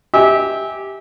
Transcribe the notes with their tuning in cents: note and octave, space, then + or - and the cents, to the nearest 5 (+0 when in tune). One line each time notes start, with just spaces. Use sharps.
G4 +0 E5 -25 G#5 -10